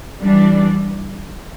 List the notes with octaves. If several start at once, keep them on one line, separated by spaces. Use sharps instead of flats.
E3 G3 D4